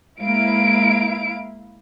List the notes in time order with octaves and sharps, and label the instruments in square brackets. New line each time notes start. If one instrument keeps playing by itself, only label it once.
[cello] G#3 A#3 [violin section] E4 F5 D7